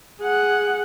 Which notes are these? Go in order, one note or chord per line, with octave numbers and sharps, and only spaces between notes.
G#4 F#5